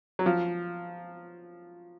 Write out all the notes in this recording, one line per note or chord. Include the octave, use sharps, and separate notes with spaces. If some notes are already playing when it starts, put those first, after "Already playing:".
F#3
F3